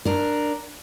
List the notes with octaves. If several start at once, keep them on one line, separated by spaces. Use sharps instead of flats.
D4 A#4